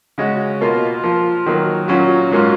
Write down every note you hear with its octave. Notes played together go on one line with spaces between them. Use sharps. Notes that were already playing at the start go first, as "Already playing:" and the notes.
C#3 G#3 C#4 F#4
B2 A#3 F4
F3 A#3 F4
D#3 F#3 A#3
A#2 F#3 C#4 F#4
G#2 F#3 A#3 C#4 F4